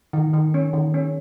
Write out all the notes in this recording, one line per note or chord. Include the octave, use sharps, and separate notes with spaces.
D#3
D#3
C#4
D#3
C#4